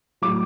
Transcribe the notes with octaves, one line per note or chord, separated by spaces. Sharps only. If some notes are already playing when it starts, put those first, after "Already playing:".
A2 F#3 D6